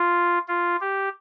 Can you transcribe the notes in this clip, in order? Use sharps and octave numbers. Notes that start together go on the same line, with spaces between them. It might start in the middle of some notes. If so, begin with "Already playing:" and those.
Already playing: F4
F4
G4